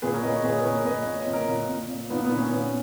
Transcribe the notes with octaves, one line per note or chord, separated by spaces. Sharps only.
A#2 G#4 B4
A#4 C#5
A#2 B4 D#5
C#5
A#2 G#4 B4
B4
A#2 A#4 C#5
C#5
A#2 B4 D#5
A#2 C#5
D#5
A#2
A#4 C#5
A#2
A#2
A#2
A#2 B3 D#4
B3
A#2
C#4
A#2 B3